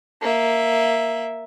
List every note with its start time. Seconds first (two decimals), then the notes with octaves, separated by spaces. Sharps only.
0.22 A#3 E5